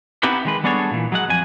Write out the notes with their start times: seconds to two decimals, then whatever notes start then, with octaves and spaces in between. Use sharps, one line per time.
0.23 B3 C4 D#4 E4 G4 B4
0.45 D#3 G#3 B4
0.64 G3 B3 D4 G#4 A4 C#5
0.91 A#2 E3
1.12 F#3 G#3 F#5
1.29 F2 G#5